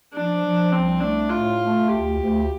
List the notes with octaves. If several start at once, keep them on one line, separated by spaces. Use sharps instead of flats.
F3 D4
F3
C2 C4
A3 D4
A2 F4
A3
D2 G4
D2